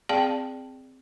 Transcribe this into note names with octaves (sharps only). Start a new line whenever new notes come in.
C4 G#4 D5 F5 G5 A5